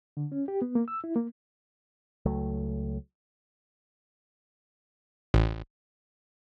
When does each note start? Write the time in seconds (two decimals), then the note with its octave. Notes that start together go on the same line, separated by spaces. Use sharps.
0.17 D3
0.32 C#4
0.48 G4
0.62 B3
0.75 A#3
0.88 E6
1.04 E4
1.16 A#3
2.26 C#2 F#3 A3
5.34 A1